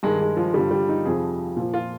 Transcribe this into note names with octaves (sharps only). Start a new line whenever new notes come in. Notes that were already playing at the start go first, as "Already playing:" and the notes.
G2 D#3 G#3
G#3
F3
G2 D3 F3 G3
G3
D#4
F2 C3 F3 G#4
A#2 F3
F4